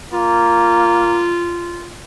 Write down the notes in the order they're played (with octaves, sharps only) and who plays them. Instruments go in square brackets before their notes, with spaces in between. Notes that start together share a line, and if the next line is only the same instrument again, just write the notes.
[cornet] A#3 [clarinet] F4